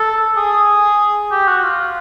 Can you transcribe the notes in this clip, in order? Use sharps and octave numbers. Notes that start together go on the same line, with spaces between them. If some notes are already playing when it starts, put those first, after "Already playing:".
Already playing: A4
G#4
G4
F#4
F4